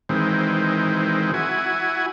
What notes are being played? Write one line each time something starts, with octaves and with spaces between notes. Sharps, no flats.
D#3 E3 G#3 C4
E4 F#4 G#5